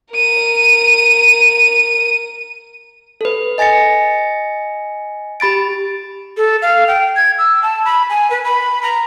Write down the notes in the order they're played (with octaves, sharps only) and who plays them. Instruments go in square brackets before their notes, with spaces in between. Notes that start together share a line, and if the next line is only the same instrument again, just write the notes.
[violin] A#4 D#7
[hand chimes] A4 B4
D#5 G#5 A6 A#6 C#7
G4 B5 A6 D7
[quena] A4
F5
G5
G#6
E6
A5
B5
G#5
B4
B5
A#5